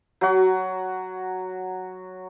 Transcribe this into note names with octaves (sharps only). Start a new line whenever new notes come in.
F#3 F#4